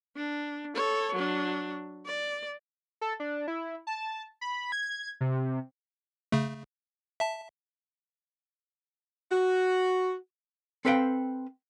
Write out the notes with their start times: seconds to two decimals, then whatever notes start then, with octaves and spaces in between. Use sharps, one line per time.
0.16 D4
0.75 A4 C#5
1.15 F#3 D4
2.06 D5
3.01 A4
3.20 D4
3.48 E4
3.87 A5
4.41 B5
4.72 G#6
5.21 C3
6.32 C#3 A3
7.20 E5 A5
9.32 F#4
10.85 C4 A4 B4 F5 G5